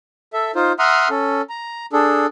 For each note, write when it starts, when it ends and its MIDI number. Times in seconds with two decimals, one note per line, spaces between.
0.33 0.51 69
0.33 0.51 76
0.55 0.72 63
0.55 0.72 65
0.55 0.72 72
0.79 1.08 76
0.79 1.08 78
0.79 1.08 82
0.79 1.08 84
0.79 1.08 87
0.79 1.08 89
1.10 1.42 61
1.10 1.42 69
1.49 1.86 82
1.93 2.26 62
1.93 2.26 68
1.93 2.26 69